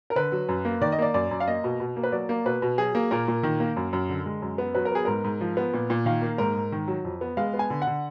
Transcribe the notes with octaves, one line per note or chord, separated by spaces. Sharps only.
A#4
D3 B4
F#3
F#2
A#3
D#3 D5
D#5
A#3 D5
F#2 D5
F#2
F5
A#3 D#5
B2
B2
A#3
B4
F#3 D5
A#3
B2 B4
B2
F#3 G#4
A#3
A#2 A#4
A#2
D#3
A#3
F#2
F#2
D3
G#3
F#2
B3
F#3 B4
A#4
B3 G#4
G#2 A#4
G#2
F3
B3
A#2
A#2
D#3 F5
A#3
G#2 A#4
G#2
D#3
F#3
F2
B3
G#3 F5
B3
G#5
D3
F#5
D3